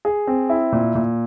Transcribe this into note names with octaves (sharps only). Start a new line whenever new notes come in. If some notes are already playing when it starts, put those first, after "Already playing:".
G#4
C4
E4
A#2
A#2